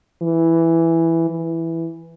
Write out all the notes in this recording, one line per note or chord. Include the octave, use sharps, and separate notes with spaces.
E3
E3